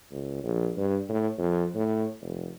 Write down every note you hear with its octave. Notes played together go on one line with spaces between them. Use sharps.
C#2
A#1
G2
A2
F2
A2
F1